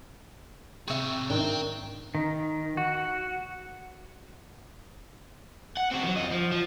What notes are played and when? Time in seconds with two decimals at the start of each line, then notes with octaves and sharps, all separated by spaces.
0.88 C3 C4 G#4 E5 G5 C#6
1.30 G#2 D#3 C4 D4 D#4 G5
2.15 D#3
2.77 F#4
5.77 F#5
5.91 C4 F#4
6.03 D#3 F#3
6.16 F2 D#5
6.31 F3
6.52 F3